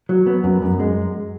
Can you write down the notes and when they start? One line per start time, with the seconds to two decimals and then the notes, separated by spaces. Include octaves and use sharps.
0.09 F#3
0.26 B3
0.44 F#2
0.62 F#2
0.79 G#3